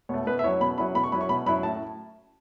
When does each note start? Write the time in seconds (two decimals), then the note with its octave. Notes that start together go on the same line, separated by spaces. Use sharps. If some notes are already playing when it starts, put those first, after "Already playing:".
0.09 B2 A3 C#5
0.26 B2 B4
0.39 E5
0.44 F#3 C#4 E4 C#5
0.61 B2 B5
0.78 F#3 C#4 E4 B5
0.95 B2 B5
1.04 C#6
1.12 F#3 C#4 E4 B5
1.21 C#6
1.29 B2 B5
1.46 F#3 C#4 E4 B5
1.63 A2 A5